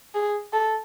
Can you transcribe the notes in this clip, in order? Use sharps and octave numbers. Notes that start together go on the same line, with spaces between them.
G#4
A4